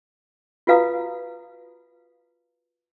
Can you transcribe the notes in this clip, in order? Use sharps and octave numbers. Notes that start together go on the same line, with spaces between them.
F4 F#4 B4 F5 A#5 D#6